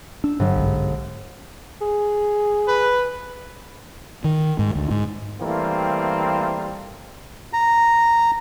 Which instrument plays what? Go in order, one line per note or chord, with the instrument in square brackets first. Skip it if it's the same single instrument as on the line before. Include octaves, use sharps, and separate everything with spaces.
[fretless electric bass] D4 [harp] E6
[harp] G1 [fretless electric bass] G2 F#3
[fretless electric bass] B1 G#2
[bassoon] G#4
[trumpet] B4
[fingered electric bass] D#3
G#2
D2
G#2
[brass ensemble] E3 G3 A3 A#3 C4 F4
[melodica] A#5